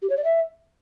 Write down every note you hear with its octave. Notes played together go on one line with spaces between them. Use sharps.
G4
C#5
D5
E5